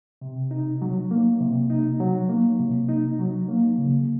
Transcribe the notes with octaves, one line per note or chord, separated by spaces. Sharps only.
C3
D#4
F#3
A#3
C3
D#4
F#3
A#3
C3
D#4
F#3
A#3
C#3